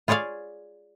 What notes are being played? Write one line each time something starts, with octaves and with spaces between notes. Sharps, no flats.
F4 G#4 C#5 D5 F5